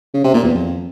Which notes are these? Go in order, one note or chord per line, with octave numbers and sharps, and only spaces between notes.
C#3
C3
A#2
E2
F2